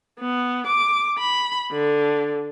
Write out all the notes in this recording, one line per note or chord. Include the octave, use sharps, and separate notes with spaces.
B3
D6
B5
D3